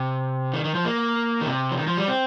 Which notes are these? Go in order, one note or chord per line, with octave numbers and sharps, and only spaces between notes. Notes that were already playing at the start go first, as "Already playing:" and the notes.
Already playing: C3
D#3
D#3
F3
A#3
D#3
C3
F3
D#3
F3
G3
C4